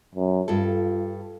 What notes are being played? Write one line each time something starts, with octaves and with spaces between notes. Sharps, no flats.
F#2
G2 F4 A4